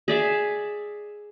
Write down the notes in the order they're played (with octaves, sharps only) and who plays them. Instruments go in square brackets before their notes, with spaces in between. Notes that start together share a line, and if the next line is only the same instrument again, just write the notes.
[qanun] G#4 D5 E5